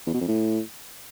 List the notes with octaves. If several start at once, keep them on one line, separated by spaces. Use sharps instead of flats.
E2
B2
F2
A2